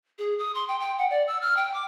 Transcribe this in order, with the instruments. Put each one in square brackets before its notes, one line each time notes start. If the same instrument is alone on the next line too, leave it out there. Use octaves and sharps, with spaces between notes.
[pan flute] G#4
D#6
C6
G5
G5
F#5
D5
E6
F6
G5
D6